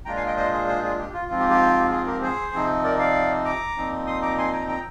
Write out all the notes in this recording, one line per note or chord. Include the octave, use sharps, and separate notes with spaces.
A#2 G#3 D4 F4 G5 A#5
F5 G#5
D#5 G5
C5 D#5
G#4 C5
G#4 C5
F4 G#4
G4
F4
G#2 F3 C4 F4
G4
G4
F4 G#4
G4 A#4
G#4 C5
C3 F3 C4 D#4
A#4 D5
D5 F5
A#5 D6
A#2 F3 C4 D#4
C6 D#6
A#5 D6
G#5 C6
G5 A#5
G5 A#5